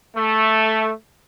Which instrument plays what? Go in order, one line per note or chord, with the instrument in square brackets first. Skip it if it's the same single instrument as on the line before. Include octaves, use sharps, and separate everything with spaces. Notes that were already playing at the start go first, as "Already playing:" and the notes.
[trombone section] A3